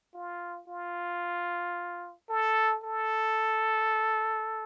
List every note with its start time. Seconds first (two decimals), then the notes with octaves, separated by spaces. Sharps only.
0.14 F4
0.68 F4
2.29 A4
2.84 A4